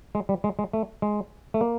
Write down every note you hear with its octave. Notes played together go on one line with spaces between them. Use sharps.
G#3
G3
G#3
G#3
A3
G#3
A3
A#3